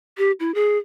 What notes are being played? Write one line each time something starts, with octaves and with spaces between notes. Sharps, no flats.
G4
E4
G#4